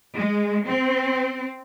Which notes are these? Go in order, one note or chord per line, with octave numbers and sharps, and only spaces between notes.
G#3
C4